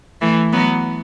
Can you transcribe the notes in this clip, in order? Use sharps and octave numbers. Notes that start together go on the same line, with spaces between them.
E3 A3
F#3 B3